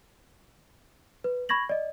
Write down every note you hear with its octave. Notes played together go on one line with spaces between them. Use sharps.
B4
B5 C#6 G#6 A#6 F#7
D5 D#5